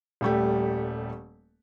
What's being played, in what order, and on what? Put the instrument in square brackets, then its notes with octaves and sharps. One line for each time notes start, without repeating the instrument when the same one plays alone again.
[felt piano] D#1 G3 A3 G4